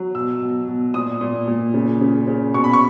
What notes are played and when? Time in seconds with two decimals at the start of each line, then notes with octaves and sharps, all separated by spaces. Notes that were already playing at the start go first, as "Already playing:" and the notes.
Already playing: F#3
0.15 B2 E6
0.42 B2
0.68 B2
0.94 A#2 D#6
1.21 A#2
1.48 A#2
1.74 C#3
2.01 C#3
2.27 C#3
2.54 B2 C#6
2.64 B5
2.73 C#6